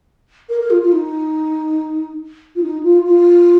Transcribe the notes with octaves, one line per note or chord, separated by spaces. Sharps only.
A#4
A#4
F4
F4
D#4
F4
D#4
F4
F4